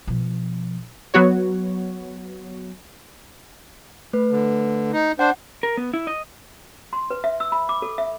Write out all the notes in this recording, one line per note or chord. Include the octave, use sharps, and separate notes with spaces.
B2 F3
F#3 B3 F#4 C#5
A3 B4
D3
D#4
D4 C5 F#5
A#4
B3
E4
D#5
C6
B4
E5
E6
B5
D6
A4
E5